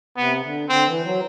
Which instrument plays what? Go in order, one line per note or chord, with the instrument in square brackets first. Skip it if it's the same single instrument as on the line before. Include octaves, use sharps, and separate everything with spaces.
[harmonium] C3 [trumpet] B3
[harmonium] D3
[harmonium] D3 [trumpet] C4
[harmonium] E3
F#3